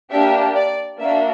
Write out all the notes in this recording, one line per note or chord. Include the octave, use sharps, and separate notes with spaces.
A#3 D4 G4 E5
D5
A#3 D4 F#4 E5